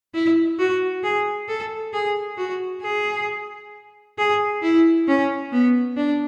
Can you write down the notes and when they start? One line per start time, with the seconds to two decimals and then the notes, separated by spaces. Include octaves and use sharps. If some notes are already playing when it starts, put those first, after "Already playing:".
0.14 E4
0.59 F#4
1.03 G#4
1.48 A4
1.94 G#4
2.38 F#4
2.83 G#4
4.18 G#4
4.63 E4
5.08 C#4
5.52 B3
5.97 D4